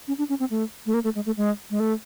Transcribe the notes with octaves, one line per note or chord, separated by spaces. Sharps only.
C#4
D4
C#4
C4
A3
A3
A#3
A3
G#3
A3
G#3
G#3
A3